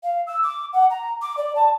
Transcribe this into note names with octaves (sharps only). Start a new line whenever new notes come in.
F5
E6
D6
F#5
A#5
D6
D5
A5